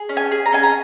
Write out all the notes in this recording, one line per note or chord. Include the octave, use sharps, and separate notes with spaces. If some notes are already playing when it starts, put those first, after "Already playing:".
Already playing: G#4
C#4
G#5
G#4
A#5
C#4 G#5
A#5